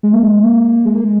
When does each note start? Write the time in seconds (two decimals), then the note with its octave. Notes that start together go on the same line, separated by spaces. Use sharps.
0.03 G#3
0.13 A#3
0.23 G#3
0.34 G#3
0.43 A#3
0.85 G#3
0.95 A#3
1.04 G#3